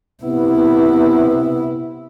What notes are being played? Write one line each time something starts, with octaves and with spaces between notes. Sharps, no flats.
C3 B3 E4